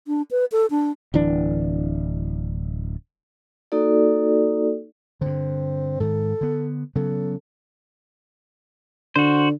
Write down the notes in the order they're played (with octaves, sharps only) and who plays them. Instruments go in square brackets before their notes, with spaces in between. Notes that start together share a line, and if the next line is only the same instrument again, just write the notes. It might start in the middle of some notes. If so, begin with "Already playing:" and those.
[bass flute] D4
B4
A4
D4
[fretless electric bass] D1 E3 D4
[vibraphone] A#3 D#4 F#4 A4 D5
[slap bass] G2 D3 [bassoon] C4
[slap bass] G#2 D#3 [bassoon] A4
[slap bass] D3 B3
[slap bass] C#3 F#3 B3 [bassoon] A4
[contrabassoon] D3 [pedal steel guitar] F#4 C5